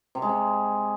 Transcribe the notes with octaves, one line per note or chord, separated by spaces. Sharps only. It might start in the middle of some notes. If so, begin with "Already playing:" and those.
C3
G#3
C3